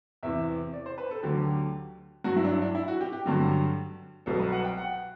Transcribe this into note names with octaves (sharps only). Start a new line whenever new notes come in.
E2 C3 E3 E5
D5
C5
B4
A4
D2 D3 F#3 G4
G2 F#3 F#4
E4
D4
E4
D4
E4
F#4
G4
G4
G2 D3 F#3
C2 B2 F#3 A4
B4
F#5
G5
F#5